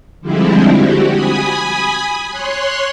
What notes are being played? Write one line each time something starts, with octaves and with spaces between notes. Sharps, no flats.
D3 F3 G3 G#3 C4 E4
F#4 G4
G#5 B5 D#6
C#5 C6 F#6